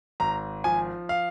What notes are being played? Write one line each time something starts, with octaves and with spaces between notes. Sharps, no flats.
G#1 A#5
F3 G#5
F5